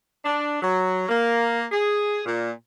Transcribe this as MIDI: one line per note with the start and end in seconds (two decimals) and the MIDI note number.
0.25 0.60 62
0.61 1.05 54
1.09 1.63 58
1.72 2.21 68
2.26 2.50 46